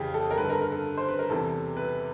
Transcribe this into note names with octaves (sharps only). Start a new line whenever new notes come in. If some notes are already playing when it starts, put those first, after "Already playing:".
Already playing: F2 C#3 E3 G4 G#4
A4
A#4
G2 D3 B4
A4
A#4
A#4
A4
C5
B4
A#4
E2 C3 E3 A4
B4